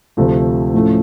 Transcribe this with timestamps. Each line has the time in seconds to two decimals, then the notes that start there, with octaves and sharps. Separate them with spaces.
0.17 D2 C3 F3 A3
0.74 A2 F3 A3 C#4